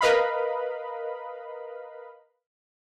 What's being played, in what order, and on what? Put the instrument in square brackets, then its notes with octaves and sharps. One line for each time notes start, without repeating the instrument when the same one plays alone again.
[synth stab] A#4 B4 D#5 F5 B5